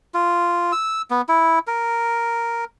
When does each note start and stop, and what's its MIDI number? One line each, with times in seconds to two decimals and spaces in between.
0.14 0.72 65
0.72 1.02 88
1.10 1.22 59
1.29 1.59 64
1.67 2.65 70